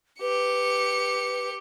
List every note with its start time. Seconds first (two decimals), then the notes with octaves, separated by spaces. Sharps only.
0.21 G4 B4 C#7